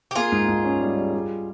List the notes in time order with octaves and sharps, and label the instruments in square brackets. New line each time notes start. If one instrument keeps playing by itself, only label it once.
[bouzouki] G4
[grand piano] A#3 [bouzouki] F4 G#4
[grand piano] G#2
G#2
C#4
G3
G3
G3